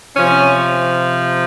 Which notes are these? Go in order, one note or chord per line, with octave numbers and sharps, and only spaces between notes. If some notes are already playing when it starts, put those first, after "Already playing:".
C3 F3 C#4